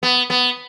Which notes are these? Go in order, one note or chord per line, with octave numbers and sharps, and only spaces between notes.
B3
B3